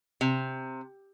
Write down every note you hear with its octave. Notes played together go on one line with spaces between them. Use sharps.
C3